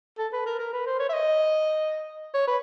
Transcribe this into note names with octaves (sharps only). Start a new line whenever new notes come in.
A4
B4
A#4
A#4
B4
C5
C#5
E5
D#5
C#5
B4